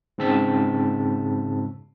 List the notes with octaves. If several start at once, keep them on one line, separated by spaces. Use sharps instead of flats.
G#2 C#3 C4 A5 E6 B6